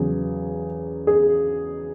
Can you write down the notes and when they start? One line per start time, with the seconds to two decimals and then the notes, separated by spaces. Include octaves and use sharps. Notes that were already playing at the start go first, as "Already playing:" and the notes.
Already playing: E2 C#3 F#3 G#4
1.07 G#4